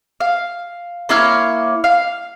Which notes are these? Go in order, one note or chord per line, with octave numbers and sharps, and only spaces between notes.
F5
A#3 E4 C#5 F6
F5